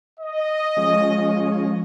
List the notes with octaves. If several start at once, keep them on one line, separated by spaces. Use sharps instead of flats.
D#5
F3 G#3 C#4